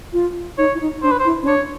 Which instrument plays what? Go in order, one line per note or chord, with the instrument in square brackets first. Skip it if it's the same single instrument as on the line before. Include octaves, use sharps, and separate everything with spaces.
[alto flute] F4
[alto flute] D#4 [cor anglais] C#5
[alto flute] E4
D#4
[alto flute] D4 [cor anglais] C5
[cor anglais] B4
C5
[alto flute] E4
C#4
[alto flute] D4 [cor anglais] C#5